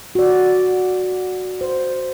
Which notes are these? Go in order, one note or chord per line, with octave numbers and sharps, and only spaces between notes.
F#4 D5
C5